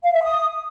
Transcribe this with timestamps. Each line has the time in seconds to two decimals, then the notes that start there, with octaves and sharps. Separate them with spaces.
0.03 F5
0.13 E5
0.23 D#6